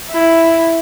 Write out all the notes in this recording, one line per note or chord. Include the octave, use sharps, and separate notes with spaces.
E4